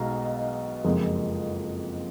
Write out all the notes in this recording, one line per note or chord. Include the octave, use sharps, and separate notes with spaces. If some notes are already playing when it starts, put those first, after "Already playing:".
Already playing: B1 B2 G#3 F5 A#5
F#1 F2 F3 G#3